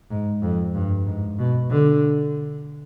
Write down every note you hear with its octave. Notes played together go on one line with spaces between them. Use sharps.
G#2
F2
G2
G#2
B2
D3